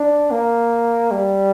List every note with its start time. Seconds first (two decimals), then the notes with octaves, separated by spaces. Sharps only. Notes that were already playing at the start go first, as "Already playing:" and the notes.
Already playing: D4
0.31 A#3
1.11 G3